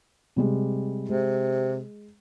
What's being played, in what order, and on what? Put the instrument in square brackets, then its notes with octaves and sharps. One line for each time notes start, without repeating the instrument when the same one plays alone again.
[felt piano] C3 G3 G#3
[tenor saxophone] C3 [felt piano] G#3